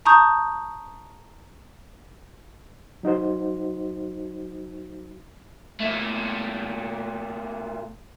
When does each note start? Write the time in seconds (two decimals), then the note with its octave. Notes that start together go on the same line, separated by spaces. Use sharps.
0.05 A5 A#5 C#6 D#6 G6
3.03 F#3 D#4 F#4 C5
5.80 A#2 A3